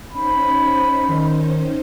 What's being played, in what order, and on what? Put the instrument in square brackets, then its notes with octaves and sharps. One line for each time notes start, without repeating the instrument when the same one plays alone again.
[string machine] C#4 D#4 C5 [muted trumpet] B5
[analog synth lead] D#3